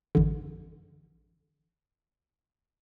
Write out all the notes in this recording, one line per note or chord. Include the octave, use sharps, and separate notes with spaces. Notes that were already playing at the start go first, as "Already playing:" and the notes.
A1 F#2 D3